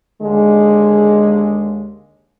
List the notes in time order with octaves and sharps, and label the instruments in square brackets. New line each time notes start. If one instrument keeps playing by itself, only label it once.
[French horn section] D#2 D3 G#3